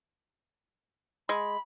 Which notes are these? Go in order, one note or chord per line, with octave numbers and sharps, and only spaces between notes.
G#3 B5